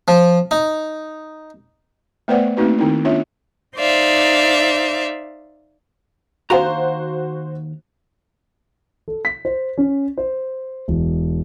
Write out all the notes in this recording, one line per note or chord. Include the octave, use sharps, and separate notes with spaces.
F3
D#4
A3 B3 B4 C5 D5 F#5
A3 A#3 C4 D#4 F#4 B4
D#3 C4 D#4 E4
B3 C#4 D4 F4 C#5 E5
D#4 C5 D5 E5 F5
D#2 F#4 C5 F5 A#5
A4
B6
C5
C#4
C5
E1